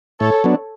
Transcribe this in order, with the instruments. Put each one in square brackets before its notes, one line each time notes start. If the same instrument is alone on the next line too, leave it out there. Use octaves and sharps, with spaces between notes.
[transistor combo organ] A2 [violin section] A4 C#5
[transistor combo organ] F#3 B3 D4